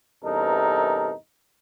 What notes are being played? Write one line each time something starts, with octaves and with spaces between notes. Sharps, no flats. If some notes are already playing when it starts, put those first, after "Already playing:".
E2 G2 C3 D#4 A4 A#4